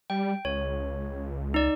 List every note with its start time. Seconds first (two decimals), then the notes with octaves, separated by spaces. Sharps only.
0.10 G3 G5
0.45 C#2 C#5
1.54 D#4 D5